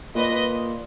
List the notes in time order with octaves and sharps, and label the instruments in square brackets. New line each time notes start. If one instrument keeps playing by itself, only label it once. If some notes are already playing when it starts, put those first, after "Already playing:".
[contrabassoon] A#2 [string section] B4 D#5